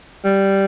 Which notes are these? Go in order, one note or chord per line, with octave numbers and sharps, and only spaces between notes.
G3